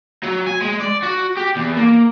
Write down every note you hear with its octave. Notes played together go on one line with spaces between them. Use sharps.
F#3
G#5
G#3
D5
F#4
G4
E2
A#3